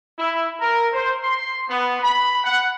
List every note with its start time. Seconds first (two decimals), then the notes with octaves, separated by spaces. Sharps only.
0.18 E4
0.60 A#4
0.93 C5
1.24 C6
1.69 B3
2.02 B5
2.44 F#5